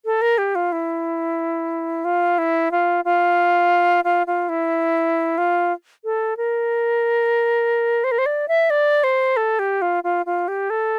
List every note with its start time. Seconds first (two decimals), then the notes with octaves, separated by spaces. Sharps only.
0.05 A4
0.22 A#4
0.38 G4
0.55 F4
0.72 E4
2.05 F4
2.38 E4
2.71 F4
3.05 F4
4.04 F4
4.27 F4
4.49 E4
5.38 F4
6.04 A4
6.37 A#4
8.04 C5
8.12 A#4
8.18 C5
8.26 D5
8.48 E5
8.70 D5
9.04 C5
9.37 A4
9.59 G4
9.82 F4
10.04 F4
10.26 F4
10.48 G4
10.70 A4